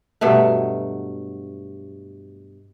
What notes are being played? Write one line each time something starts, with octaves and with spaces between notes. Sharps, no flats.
G2 B2 F#3 A3